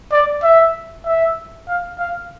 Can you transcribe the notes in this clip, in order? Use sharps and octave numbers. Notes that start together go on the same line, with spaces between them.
D5
E5
E5
F5
F5